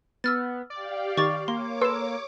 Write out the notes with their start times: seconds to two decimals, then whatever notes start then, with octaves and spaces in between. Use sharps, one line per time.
0.24 B3 E6 F6 A6
0.70 G4 D5 F5
1.17 D#3 C#6 D6 A6
1.48 A#3 C#5 C6 D6
1.81 A4 B4 C6 E6 E7